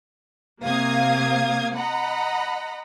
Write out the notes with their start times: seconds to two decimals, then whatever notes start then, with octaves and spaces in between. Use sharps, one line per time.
0.63 C3 A#3 F5 D#6 G#6
1.76 D#5 F#5 A#5 B5